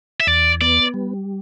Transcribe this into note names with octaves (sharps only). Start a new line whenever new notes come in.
E5
E2 D5
B3 D5
G3